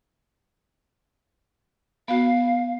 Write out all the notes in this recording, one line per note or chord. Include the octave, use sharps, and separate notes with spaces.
B3 F#4 F5